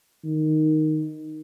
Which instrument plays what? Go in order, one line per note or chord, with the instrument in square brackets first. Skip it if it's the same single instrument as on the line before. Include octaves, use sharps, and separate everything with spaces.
[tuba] D#3